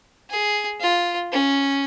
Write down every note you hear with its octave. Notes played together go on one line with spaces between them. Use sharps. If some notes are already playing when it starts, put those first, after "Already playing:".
G#4
F4
C#4